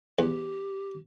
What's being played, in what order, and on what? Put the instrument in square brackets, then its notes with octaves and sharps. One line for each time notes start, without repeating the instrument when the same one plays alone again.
[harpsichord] E2 [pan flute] G4